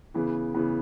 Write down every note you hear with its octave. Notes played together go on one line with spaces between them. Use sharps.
C#3 E3 B3
C#3 E3 B3